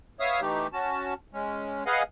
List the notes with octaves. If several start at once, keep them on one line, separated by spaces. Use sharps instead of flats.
B3 C#5 E5 F5 D#6
E3 A3 D#4 G4
C#4 F#4 A5
G#3 C#4
G#4 B4 D#5 F5 F#5 G#5